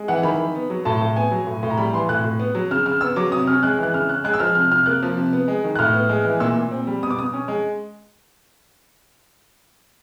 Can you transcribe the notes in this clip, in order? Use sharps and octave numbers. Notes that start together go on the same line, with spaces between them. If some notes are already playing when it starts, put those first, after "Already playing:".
Already playing: G#3
E3 F#5
D#3 B5
D#3
B3
F#3
A2 A5
A2
B3 G#5
F#3
A2
A2
A#5
G3 B5
E3 C6
A2 F#6
A2
B3
F#3
C#3 F6
C#3 F6
B3 E6
F#3 D6
C3 D#6
C#4 F6
G#3 F#6
E3 F#6
C#3 F6
C#4 F#6
G#3 F#6
E6
F3 F6
C3 F6
C3 F6
A#3 F#6
F3
C3
B3
G#3
D#3
F#6
A2 F6
B3
G#3
E3
A#2 E6
A#2
C4
G3
B2 D#6
D6
B2 D#6
C#4
G#3